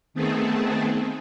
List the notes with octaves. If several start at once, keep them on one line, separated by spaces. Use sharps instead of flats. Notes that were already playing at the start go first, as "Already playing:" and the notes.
D#3 A3 B3 C4 G#4 A4